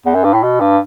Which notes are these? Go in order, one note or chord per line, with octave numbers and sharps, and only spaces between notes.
E2
F#2
G2
A2
B2
G2